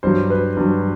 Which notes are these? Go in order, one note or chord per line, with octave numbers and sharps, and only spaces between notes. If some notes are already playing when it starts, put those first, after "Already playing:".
G2 F#3 C5
B4
G2 F#3